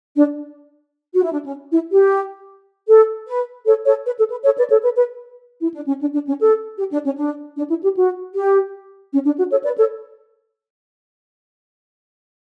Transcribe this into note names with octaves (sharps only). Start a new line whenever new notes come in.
D4
F#4
E4
D4
C#4
E4
G4
A4
B4
A4 C#5
A4 C#5
B4
A4
B4
A4 C#5
B4 D5
A4 C#5
B4
B4
E4
D4
C#4
D4
D4
C#4
A4
G4
D4
C#4
D4
D4
E4
G4
F#4
G4
C#4
D4
F#4
A4 C#5
B4 D5
A4 C#5